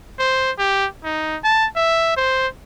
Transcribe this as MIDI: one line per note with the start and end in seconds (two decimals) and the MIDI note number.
0.19 0.51 72
0.58 0.87 67
1.04 1.37 63
1.44 1.67 81
1.76 2.14 76
2.16 2.47 72